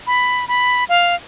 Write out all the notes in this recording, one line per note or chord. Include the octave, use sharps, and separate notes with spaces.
B5
B5
F5